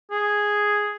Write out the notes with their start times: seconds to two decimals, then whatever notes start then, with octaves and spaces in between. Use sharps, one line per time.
0.11 G#4